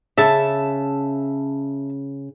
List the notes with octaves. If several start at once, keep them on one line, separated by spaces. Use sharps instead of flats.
C#3 E5 A5